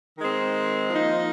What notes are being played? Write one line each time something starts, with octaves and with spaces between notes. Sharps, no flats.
D#3 G#3 C4
F3 A#3 D#4